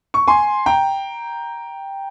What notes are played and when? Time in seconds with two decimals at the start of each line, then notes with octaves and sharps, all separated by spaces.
0.14 C#6
0.27 G#5 C6
0.66 G5 A#5